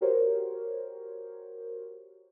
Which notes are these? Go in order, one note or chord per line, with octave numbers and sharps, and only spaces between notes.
F#4 G4 A#4 C5 C#5